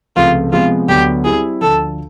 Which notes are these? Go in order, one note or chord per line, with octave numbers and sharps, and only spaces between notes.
C#2 C3 F3 A3 F4
C3 F3 G#3 B3 F4
D2 D3 F#3 B3 D4 G4
G3 C4 E4 G4 G#4
D2 D3 F3 A4